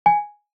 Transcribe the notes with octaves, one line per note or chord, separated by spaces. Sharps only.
G#5